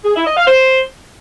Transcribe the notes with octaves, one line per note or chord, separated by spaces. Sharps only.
G#4
E4
D#5
F5
C5